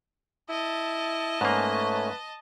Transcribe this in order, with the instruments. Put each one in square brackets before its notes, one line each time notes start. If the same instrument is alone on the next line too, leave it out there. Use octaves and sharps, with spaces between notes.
[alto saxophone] E4 [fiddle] D#5 A5
[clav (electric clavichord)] G#2 A#3 [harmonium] A3 C#4 C#5 [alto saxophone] B4